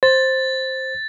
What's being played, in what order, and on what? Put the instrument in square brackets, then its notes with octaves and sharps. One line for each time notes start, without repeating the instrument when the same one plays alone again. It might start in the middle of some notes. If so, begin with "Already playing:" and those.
[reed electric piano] C5 [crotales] A6